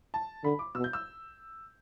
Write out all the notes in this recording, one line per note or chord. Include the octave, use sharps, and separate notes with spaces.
A5
D3 B5
D6
B2 E6
G6
E6